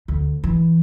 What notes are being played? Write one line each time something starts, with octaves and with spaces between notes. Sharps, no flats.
D2
E3